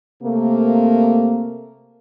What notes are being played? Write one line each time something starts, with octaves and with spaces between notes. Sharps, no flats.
C3 A3 A#3